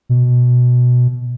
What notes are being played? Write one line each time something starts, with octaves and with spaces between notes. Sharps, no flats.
B2